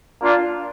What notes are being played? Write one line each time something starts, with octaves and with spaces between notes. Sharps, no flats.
A#3 D4 F4